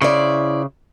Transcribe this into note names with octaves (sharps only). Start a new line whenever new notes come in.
C#3 E4 C5 D5